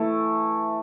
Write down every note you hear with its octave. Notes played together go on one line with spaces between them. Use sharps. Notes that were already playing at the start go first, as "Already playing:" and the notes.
Already playing: E3 A3